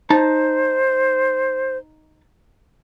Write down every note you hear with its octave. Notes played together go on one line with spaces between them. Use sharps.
D#4 C5 A5